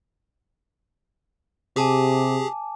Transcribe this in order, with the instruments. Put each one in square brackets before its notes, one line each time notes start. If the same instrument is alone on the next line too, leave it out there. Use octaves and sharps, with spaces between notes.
[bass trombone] C3 [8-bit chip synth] G4 G#4 [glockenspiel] G#5 A5 D6